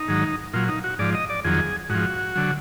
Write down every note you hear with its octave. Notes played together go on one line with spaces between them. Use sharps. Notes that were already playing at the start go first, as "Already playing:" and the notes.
Already playing: D#4
G#2 D#3 F#3
A#2 F#3 F4
D#4
F#4
G#2 F3 D5
D#5
D5
F2 D#3 F#3 G#4
G#2 F3 F#4
D3 F#3